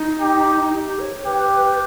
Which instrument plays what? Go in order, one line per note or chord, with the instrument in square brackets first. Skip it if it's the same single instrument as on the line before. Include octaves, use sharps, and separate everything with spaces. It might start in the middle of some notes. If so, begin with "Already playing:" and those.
Already playing: [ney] D#4
[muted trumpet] G4
[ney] G4
C#5
[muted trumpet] G4 [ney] B4